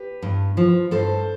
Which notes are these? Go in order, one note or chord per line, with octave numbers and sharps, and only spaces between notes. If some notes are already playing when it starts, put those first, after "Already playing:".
Already playing: G4 B4
G2
F3
G2 A4 C5